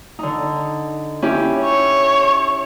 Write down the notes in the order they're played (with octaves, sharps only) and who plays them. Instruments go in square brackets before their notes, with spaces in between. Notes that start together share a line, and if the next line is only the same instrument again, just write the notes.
[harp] D3 D#4
C#4 E4 G4
[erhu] C#5